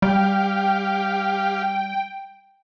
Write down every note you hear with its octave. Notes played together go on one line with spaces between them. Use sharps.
G3 G4 F5 G5